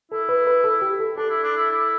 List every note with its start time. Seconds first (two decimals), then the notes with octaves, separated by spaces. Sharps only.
0.12 E4 A4
0.29 B4
0.47 B4
0.64 A4
0.82 G4
1.00 A4
1.17 D4 A4
1.30 E4
1.43 D4
1.57 E4
1.70 E4